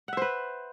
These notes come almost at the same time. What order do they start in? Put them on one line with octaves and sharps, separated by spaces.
F#5 E5 C5 B4